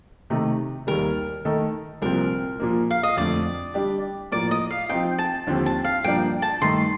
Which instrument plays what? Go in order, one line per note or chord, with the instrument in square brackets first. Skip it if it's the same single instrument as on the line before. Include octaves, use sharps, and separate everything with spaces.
[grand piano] C3 D#3 A3 D#4
[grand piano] D#2 D#3 G3 [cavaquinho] A#4
[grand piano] D#3 A3 D#4 A4
[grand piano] C2 A#2 F3 C4 [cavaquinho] A#4
[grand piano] A#2 F3 A#3
[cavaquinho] F5
D#5
[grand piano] F2 D3 A3 [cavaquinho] D5
[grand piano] G3 D4 G4
[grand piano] A2 F3 A#3 [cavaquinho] D5
[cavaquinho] D#5
F5
[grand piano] F3 C4 D#4 [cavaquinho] G5
[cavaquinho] A5
[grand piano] D#2 D3 F3 C4 G4
[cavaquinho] A5
F5
[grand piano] G2 F3 A#3 D4 [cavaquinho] G5
[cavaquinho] A5
[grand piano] G2 D#3 A3 D#4 [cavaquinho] C6